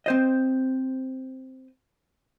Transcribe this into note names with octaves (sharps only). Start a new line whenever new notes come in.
C4 C5 D#5